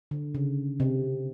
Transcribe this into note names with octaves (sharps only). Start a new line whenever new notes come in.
D3
C#3
C3